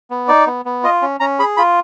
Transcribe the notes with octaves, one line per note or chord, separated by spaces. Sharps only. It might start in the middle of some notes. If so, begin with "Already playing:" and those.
B3
D#4 D5
B3
B3
F4 D#5
C#4
C#4 A#5
G#4 B5
F4 B5